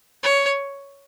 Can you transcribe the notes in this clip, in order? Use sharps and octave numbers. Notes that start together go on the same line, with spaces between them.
C#5